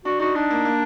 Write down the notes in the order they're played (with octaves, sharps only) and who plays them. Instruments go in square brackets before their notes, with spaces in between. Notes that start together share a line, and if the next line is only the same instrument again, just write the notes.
[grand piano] D4 [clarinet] F#4
[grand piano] D#4 [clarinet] F#4
[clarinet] D4 [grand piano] D#4
[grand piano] A#3
A#3